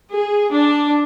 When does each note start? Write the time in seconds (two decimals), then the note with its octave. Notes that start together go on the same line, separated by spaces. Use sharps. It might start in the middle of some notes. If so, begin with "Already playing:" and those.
0.13 G#4
0.53 D4